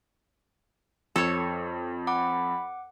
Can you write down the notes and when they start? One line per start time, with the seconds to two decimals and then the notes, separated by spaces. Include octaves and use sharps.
1.16 F2 A4 C#5
2.07 F#5 B5 D6